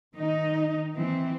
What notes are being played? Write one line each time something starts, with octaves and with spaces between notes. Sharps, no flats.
D#3 D#4
E3 C4